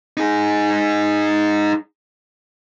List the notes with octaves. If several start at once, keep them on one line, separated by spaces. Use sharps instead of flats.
D#4 G#4